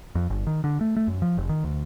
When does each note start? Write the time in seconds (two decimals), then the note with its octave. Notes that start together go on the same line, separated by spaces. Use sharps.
0.15 F2
0.30 G1
0.47 D#3
0.64 D3
0.81 A3
0.96 A3
1.08 F#2
1.22 F3
1.37 F1
1.49 D#3
1.64 D2